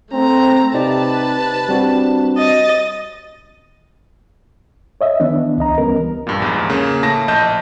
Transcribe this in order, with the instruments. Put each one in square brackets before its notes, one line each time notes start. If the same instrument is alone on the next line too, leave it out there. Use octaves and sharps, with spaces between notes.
[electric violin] A3 A#5 [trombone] C4
[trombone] C3 [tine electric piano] D#4 G4 D5 [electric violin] B4 A5
[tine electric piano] G3 C4 F#4 [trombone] D4
[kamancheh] D#5 [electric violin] A6
[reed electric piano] C#5 D#5 E5
D#3 E3 B3 D4
C#2 C#3 D#5 A#5
E3 G3 B3 C#4 A#4
[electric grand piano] A#1 G2 A#2
A#1 E2 G#2
C#3 A#3
A2 A5 A#6
A#1 D#5 A5 G6